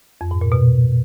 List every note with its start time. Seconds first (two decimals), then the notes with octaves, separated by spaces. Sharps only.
0.21 F2
0.31 G#2
0.41 A#2
0.52 B2